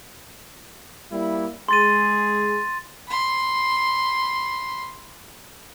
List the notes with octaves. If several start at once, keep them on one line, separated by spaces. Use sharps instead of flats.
G3 A#3 E4
G#3 G#4 C6 A6 D#7
B5 C6